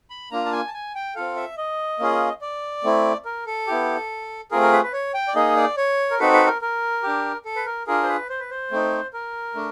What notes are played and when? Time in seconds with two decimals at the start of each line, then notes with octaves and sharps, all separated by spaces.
0.10 B5
0.31 A#3 D4 F4 A#5
0.46 A5
0.52 G#5
0.67 A5
0.74 G#5
0.95 G5
1.16 C4 F4 A4 F5
1.36 E5
1.57 D#5
2.00 A#3 C#4 F4 G#4
2.41 D5
2.84 A3 C4 E4
3.25 A#4
3.46 A4
3.67 B3 E4 G4
4.51 A3 C4 F4 G#4 A#4
4.62 A#4
4.72 B4
4.83 B4
4.93 C#5
5.14 G5
5.28 D5
5.35 A#3 D#4 G#4 D#5
5.56 D5
5.77 C#5
6.11 A#4
6.19 C4 D#4 F#4 A4 B4
6.33 B4
6.47 A#4
6.62 A#4
7.03 D4 G4
7.45 A4
7.56 B4
7.66 A#4
7.87 D4 F4 G#4 A#4
8.03 C5
8.08 B4
8.29 C5
8.40 B4
8.50 C5
8.71 A3 C4 D#4
9.13 A#4
9.55 A3 D4